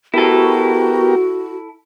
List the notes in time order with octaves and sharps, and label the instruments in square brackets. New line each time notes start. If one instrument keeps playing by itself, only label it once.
[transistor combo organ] B3 G4 A#4 [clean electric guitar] E4 A4 [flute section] F#4